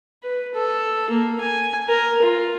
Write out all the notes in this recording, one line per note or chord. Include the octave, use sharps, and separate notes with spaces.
B4
A4
A#3
G#5
A#4
F4